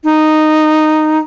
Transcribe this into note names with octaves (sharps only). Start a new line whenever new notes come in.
D#4